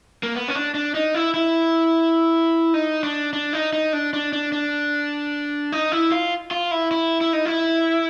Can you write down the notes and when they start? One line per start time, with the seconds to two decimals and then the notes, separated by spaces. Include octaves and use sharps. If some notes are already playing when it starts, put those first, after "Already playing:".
0.23 A#3
0.35 B3
0.48 C#4
0.55 D4
0.75 D4
0.94 D#4
1.15 E4
1.34 E4
2.74 D#4
3.03 D4
3.33 D4
3.53 D#4
3.73 D#4
3.93 D4
4.13 D4
4.33 D4
4.52 D4
5.72 D#4
5.92 E4
6.12 F4
6.51 F4
6.71 E4
6.91 E4
7.21 E4
7.33 D#4
7.45 E4